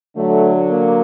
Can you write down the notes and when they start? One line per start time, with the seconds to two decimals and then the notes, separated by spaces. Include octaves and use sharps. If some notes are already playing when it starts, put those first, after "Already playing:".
0.15 D3 F#3 A3
0.70 A#3